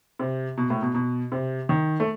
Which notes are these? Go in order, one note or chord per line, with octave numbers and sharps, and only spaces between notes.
C3
B2
A2
B2
B2
C3
D#3
A3